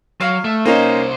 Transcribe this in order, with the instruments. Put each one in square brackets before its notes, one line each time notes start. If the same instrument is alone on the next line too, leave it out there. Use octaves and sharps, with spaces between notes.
[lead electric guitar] F#3 [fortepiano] F5
[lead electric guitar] A3
[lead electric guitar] C2 C5 [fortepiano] A#3 C#4 D#4